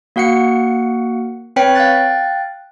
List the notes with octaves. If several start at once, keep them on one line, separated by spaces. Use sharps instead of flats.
A#3 F#4 F5 F#5 C7 C#7
C4 B4 C#5 G5 B6 C#7
F5 G5 F#6 A6